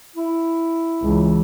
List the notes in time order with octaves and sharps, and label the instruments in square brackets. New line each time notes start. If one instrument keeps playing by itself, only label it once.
[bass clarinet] E4
[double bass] C#2 E3